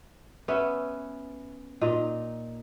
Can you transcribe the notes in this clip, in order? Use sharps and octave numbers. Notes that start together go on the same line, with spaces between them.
B3 C#4 E5
A#2 D#4 D#5